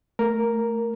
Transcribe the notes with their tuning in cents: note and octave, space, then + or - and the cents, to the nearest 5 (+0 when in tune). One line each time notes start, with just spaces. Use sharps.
A3 +0 A#4 +0